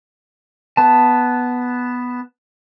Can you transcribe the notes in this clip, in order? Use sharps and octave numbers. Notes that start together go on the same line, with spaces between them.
B3 A5